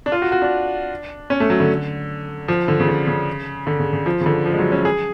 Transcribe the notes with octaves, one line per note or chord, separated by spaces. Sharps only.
D4
F4
F#4
F#4
D4
C#4
A3
F#3
D3
F3
D3
C#3
D3
C#3
D3
C#3
C#3
F3
C#3
D3
F3
G#3
F#3
C#4
G#4